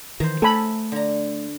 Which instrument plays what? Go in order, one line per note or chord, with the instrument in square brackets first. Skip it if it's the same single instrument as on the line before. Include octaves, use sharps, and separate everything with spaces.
[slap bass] D#3 E3 [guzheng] C5 A#5
[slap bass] A3 [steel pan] A4 G#5 B5
[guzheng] D3 A#5